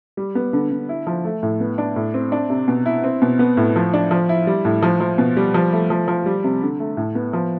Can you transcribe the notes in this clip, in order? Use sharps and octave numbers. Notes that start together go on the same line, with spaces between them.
G3
B3
D3
D3
E4
F3
A3
A2
B3
D4
A2
C4
D4
C3
B2
E4
C4
B2
B3
A2
F3
D4
F3
E4
G3
A2
F3
F3
B2
G3
F3
A3
F3
F3
G3
C3
D3
A3
A2
B3
F3